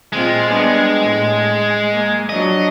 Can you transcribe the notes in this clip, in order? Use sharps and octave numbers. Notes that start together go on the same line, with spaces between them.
A#2 G#3 C4 F4
G3 B3 D4
A2
A#3
F3 F#3 D4 D#5